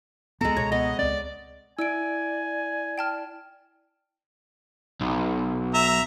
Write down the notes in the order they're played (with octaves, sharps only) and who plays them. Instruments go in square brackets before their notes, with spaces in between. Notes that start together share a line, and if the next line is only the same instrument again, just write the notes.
[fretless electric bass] C#2 F#2 B3 [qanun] G#3 A4 [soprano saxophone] A#5
[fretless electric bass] C#2 B2 [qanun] C#5
[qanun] B3 [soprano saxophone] D#5
[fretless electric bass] C#2 C4 [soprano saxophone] D5
[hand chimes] E4 [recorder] D5 [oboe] G#5 [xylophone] E6 D7
[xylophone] G5 A5 F6
[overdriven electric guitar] B1
[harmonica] E5 A#5